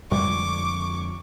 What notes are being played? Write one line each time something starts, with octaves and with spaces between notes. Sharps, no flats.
F2 D3 G3 G#3 C#6 D6